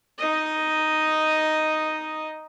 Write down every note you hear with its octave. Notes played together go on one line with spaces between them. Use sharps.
D#4 D#5